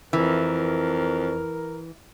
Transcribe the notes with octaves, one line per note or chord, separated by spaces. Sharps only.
F2 E3 A#4